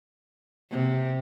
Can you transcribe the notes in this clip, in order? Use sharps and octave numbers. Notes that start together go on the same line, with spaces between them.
C3